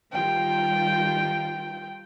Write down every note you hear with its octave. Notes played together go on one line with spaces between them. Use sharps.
D#3 G3 F4 G5